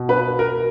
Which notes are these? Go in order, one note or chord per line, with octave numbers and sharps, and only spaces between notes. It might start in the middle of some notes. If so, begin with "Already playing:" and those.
Already playing: B2
B4
A#4